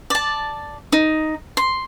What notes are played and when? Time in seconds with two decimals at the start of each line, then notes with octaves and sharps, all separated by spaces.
0.10 D5 A5
0.92 D#4
1.57 C6